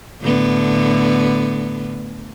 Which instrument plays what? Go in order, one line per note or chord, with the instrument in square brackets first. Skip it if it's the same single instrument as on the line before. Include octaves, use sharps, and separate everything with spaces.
[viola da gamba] A2 D3 B3